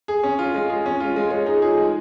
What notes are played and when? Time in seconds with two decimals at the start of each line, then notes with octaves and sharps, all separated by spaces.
0.08 G#4
0.23 C#4
0.39 F4
0.54 G#3
0.69 G#4
0.86 C#4
1.00 F4
1.16 G#3
1.31 G#3 C#5
1.46 D#4 G#4
1.62 F4 G#4
1.78 G#3 D#4